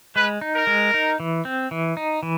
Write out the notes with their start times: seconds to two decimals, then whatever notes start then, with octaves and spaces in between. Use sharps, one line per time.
0.16 G#3 B4
0.41 D#4
0.55 A#4
0.67 G#3
0.94 D#4
1.20 E3
1.45 C4
1.71 E3
1.97 D#4
2.23 E3